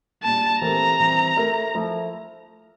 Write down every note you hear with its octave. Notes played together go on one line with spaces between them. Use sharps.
A#2 G3 D4 A5
E3 A3 C4 G4 A#4 A#5
E3 G3 C4
A3 E4 A#4
F3 A3 E4